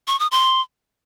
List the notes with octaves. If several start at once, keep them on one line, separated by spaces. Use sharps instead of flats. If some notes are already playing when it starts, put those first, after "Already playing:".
C#6
D#6
C6